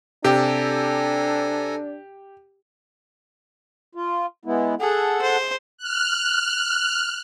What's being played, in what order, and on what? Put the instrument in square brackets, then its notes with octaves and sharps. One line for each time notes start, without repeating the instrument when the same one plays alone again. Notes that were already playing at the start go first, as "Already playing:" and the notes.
[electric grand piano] C3 [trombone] D4 [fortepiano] G4 [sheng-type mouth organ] A4 G#5 A#5
[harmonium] F4
G#3 B3 E4
[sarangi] G#4 [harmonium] A4 F#5
[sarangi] C5
[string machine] F6 F#6